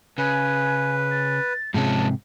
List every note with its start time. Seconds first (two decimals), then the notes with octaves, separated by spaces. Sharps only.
0.18 C#3 B4 G#5
1.11 A6
1.74 G#2 C3 F3 G#3 C#4 A5